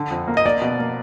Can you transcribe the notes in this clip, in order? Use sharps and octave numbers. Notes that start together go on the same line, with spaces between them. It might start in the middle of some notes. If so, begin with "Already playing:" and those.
Already playing: D3
F2
A#3
D#5
A#3 D5
B2
A#3